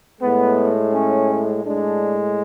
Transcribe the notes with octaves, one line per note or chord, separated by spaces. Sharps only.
A2 G#3 B3
C#4
A2 G#3 D4